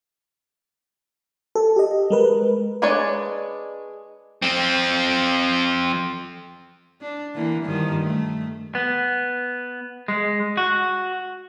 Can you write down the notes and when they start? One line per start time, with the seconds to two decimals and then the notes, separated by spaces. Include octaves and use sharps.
1.55 A4
1.76 G4 D#5
2.10 G#3 A#4 B4
2.82 G#3 D4 B4 C#5 D5
4.42 F3 C4
7.02 D4
7.35 D3 E3 A#3
7.65 G2 D#3 F3
8.01 A3
8.75 B3
10.08 G#3
10.57 F#4